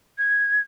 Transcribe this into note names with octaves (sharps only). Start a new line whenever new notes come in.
G#6